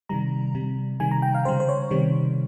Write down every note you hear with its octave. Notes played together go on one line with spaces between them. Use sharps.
C3 D#3 G3 A#5
C3 G3
C3 D#3 G3 G#5
A#5
G5
F5
C#3 G3 C5
C5
C#5
C3 D#3 G3